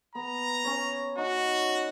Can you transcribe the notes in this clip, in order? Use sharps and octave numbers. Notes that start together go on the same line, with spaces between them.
B3 A#5
C#4 C#5
D#4 F#4